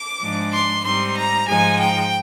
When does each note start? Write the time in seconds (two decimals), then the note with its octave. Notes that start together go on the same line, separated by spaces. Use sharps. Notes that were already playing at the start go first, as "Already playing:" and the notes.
Already playing: D6
0.20 G#2 F3 G#3 D4
0.52 C6
0.83 G#2 G3 C4 D#4 C6
1.16 A#5
1.48 G#2 F3 G#3 D#4 G#5
1.79 G5